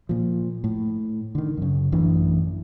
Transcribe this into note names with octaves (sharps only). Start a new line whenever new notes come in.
A#2 F3
A2
D3 D#3
F#2 C#3
A1 F#2 E3 D4